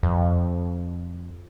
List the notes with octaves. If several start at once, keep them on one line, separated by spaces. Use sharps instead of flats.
F2